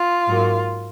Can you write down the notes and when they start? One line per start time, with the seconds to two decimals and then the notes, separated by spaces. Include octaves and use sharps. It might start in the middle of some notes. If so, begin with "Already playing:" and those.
Already playing: F4
0.27 G#2 F#3 A#3